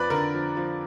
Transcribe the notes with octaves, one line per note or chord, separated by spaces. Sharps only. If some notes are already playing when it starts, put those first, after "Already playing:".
Already playing: F2 F3 B4 D5
D3 A#4
F3
F3